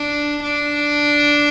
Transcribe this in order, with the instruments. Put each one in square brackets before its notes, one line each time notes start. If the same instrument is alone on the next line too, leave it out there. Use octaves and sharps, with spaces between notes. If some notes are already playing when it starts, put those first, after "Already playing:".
Already playing: [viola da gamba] D4
D4